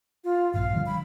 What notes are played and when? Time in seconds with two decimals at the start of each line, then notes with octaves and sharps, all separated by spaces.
0.24 F4
0.54 A#1 G2 F5
0.73 D3 F3 G3
0.86 B5